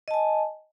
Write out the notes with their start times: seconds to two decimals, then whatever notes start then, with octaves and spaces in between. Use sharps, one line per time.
0.08 D#5
0.11 A5
0.14 G#5